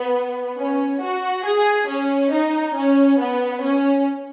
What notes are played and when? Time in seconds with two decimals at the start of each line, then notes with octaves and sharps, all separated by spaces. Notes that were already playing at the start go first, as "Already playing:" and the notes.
Already playing: B3
0.58 C#4
1.02 F#4
1.45 G#4
1.88 C#4
2.32 D#4
2.76 C#4
3.19 B3
3.62 C#4